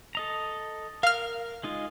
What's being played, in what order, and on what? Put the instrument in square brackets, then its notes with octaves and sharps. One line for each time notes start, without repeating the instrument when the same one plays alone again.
[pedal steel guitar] A4 D#5 A#5
[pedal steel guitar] A#4 [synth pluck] F5 F6
[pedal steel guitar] G#3 D#4 F4